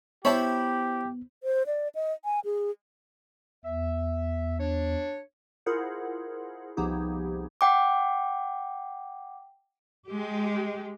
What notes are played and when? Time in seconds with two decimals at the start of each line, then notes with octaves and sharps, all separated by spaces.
0.25 B3 E4 G4 C5 C#5 E5 A5 B5
1.43 C5
1.66 D5
1.95 D#5
2.25 G#5
2.45 G#4
3.65 E2 E5
4.59 D4 C#5
5.66 E4 F4 G#4 A#4 C5 F#5
6.77 C2 F3 B3 D#4 G4 G#4
7.61 F#5 G5 D6
10.09 G#3 G4